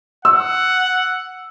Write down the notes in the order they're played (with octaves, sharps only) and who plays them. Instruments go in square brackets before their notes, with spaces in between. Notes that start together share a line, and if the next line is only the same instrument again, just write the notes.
[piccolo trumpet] F#5 [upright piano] E6